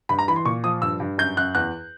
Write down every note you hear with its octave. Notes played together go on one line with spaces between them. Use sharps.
G2 B5
A#5
E3 B5
C6
A#2 C#6
F3 D#6
G2 E6
G2
F#2 G6
F#2 F#6
E2 F#6